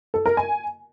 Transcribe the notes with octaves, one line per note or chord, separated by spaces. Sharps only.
A4
A#4
G#5